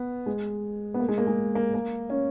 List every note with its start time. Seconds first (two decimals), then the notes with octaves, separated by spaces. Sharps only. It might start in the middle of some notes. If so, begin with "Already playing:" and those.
Already playing: B3
0.26 G#3
0.94 B3
1.00 A#3
1.08 G#3
1.18 A#3
1.27 G#3
1.55 A#3
1.74 A#3
2.10 C#4